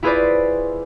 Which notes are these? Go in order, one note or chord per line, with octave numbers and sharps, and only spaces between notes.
E4 F4 G#4 B4 C5 D5